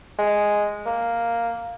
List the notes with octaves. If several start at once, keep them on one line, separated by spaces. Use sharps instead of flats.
G#3
A#3